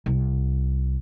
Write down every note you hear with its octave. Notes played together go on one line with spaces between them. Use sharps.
C2